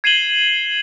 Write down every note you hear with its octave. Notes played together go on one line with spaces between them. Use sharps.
G#6 C7 D#7 E7 F#7 G7